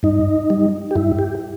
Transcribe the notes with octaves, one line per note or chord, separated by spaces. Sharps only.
G2 D#4
G3
G4
G2 E4
G4